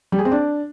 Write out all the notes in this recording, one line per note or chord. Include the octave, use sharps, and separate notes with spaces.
G3
G#4
C4
D4